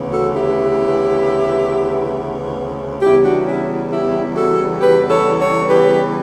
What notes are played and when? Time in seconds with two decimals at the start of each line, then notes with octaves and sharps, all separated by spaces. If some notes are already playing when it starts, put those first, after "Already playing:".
Already playing: D2 C#3 E3 B3
0.12 F#4 A4
0.34 E4 G4
3.02 E2 C#3 G3 B3 E4 G4
3.24 D4 F#4
3.46 C#4 E4
3.91 E4 G4
4.35 F#4 A4
4.81 G4 B4
5.10 A4 C#5
5.40 A4 C#5
5.69 G4 B4